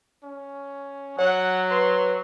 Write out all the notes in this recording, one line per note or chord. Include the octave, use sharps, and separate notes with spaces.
C#4
F#3 C#5 F#5
B4 C6